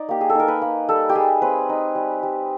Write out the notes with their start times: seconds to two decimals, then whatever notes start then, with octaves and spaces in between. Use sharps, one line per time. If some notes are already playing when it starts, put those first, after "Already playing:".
Already playing: D#4 D5
0.09 A#3 G4
0.21 G#4
0.30 A4
0.35 D#4 A#4
0.48 B4
0.62 A#3
0.89 G3 A4
1.09 G4
1.15 G3 G#4
1.42 C4 B4
1.69 D#4
1.95 G3
2.23 G3